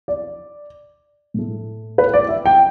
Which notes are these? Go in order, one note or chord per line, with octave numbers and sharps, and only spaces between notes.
D5
A2 A3
B4
D5
E5
G5